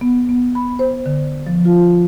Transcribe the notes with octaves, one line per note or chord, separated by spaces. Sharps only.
B3
B3
B5
C5
D3
F3
F4